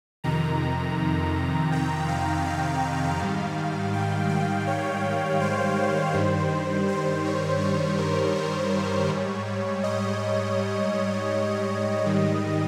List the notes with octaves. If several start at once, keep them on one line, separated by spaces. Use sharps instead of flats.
F2 C3 D#3 A#5
G5
F5
F5
G#2 D#3 G3
G5
F5
C#5
C5
G2 D#3 G3
C5
C#5
C#5
A#4
C#5
G#2 G3
D#5
G#2 D#3 G3